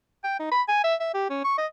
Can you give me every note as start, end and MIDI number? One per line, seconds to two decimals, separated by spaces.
0.24 0.36 79
0.39 0.48 63
0.52 0.62 83
0.68 0.82 80
0.84 0.95 76
1.00 1.13 76
1.14 1.28 67
1.30 1.42 61
1.44 1.57 85
1.58 1.66 75